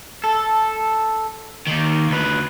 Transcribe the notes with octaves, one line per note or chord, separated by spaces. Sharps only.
A4
D#3 A#3
D2 B4